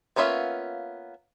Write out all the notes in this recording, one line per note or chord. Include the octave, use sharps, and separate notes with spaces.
A#3 B3 C#4 F4 E5